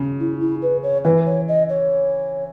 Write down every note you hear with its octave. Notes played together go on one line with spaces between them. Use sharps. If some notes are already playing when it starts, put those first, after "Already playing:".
Already playing: C#3
E4
E4
B4
C#5
E3 B4
C#5
D#5
C#5